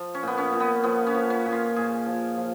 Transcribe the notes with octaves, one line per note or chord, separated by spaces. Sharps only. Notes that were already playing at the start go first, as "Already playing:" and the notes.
Already playing: F3
C#4
A#2 B3
C#4
A#2
B3
F3 B3
C#4
F3
C#4
A#2
F4
A#2 G#4
F3
F3